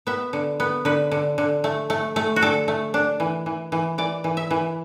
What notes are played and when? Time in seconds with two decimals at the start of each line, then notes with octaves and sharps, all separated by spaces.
0.07 B3 E5
0.33 D3
0.60 B3
0.85 D3 B4
1.11 D3
1.38 D3
1.64 A3
1.90 A3
2.16 A3
2.36 F#4
2.41 D3 A4
2.68 A3
2.94 D4
3.20 E3
3.46 E3
3.72 E3
3.98 E3 D5
4.24 E3
4.37 E5
4.51 E3